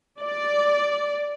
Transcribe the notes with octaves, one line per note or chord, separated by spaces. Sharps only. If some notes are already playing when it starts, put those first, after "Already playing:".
D5